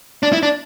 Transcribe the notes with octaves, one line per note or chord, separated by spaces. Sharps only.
D4
E4
D4